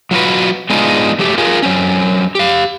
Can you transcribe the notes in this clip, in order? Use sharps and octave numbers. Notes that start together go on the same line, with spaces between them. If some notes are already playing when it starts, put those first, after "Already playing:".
F#3 F4 F#4 B4
G#3 B3 D4 D#4 F4 G#4
F#3 A3 G4
F4 G#4 A#4
F#3 C4 C#4
G4 F5